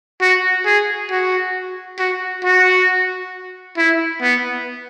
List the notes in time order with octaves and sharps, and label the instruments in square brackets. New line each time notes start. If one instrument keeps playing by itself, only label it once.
[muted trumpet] F#4
G#4
F#4
F#4
F#4
E4
B3